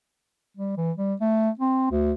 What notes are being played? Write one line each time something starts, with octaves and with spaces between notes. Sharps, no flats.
G3
E3
G3
A3
C4
D2